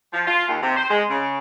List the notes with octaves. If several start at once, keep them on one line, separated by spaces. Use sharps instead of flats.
F3
F4
D#2
C3
C5
G#3
C#3